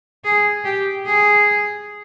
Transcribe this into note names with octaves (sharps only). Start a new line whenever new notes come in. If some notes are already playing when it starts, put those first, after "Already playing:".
G#4
G4
G#4